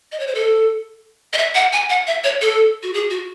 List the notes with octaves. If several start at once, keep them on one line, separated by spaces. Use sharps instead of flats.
D#5
C#5
C5
A4
D#5
E5
F#5
G#5
F#5
E5
C#5
A4
F#4
G#4
F#4